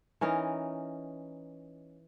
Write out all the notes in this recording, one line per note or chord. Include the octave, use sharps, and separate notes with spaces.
E3 C#4 D#4 A#4